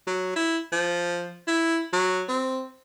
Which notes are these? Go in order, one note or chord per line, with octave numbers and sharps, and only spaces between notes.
F#3
E4
F3
E4
F#3
C4